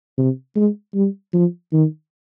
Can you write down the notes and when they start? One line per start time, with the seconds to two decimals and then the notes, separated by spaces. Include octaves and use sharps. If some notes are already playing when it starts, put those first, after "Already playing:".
0.18 C3
0.56 G#3
0.95 G3
1.33 F3
1.73 D#3